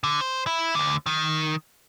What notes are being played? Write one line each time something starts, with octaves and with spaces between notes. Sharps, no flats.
D3
C5
E4
D2 D3
D#3